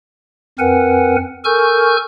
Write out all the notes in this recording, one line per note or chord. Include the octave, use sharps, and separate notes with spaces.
F2 C4 A#4 B4 F#5 G#5
A4 A#4 G#5 C#6 F6 G6